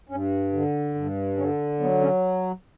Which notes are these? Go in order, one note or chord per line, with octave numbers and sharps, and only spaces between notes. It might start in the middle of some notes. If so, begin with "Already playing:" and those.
G2 C#4
D3
G2
D3 C#4
F#3 B3
C#4